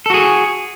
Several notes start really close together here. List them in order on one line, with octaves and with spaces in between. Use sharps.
A4 F#4 G#4